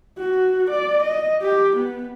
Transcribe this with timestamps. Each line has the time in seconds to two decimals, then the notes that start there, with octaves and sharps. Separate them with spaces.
0.18 F#4
0.71 D5
1.03 D#5
1.43 G4
1.76 B3